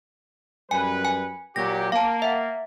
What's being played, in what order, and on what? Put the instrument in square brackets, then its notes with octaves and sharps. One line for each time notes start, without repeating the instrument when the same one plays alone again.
[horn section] F#2 G3 B4 [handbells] G#5
[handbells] G#5
[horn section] A#2 F#3 G4 [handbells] A#6
[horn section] A#3 [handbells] F5 A5
[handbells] E5 F#5